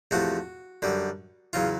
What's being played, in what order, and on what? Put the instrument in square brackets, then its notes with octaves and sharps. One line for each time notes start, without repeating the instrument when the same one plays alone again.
[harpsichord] E2 C3 F3 A3 F#4
F#2 D3 G3
E2 C#3 F#3 F4